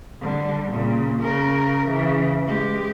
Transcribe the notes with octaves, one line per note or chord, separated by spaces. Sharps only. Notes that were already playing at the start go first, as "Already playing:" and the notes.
D3 G3
A#2 C#3
C#3 A#4
C#3 E3
G#3 G4